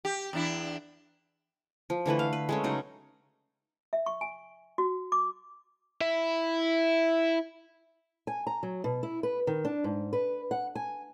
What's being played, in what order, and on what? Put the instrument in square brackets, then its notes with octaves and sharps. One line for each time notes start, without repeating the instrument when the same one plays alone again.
[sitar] G4
E2 D4 E4
[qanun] F3
D3 E3 A3 B4
F5
B4
G#3 A3 C#4
C#3 F#3 D#4
[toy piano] E5
C#6
G#5
F#4
D6
[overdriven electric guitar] E4 E5
[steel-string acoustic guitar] G#5
A#5
F#3
B2
E4
B4
D#3
D4
G#2
B4
F#5
G#5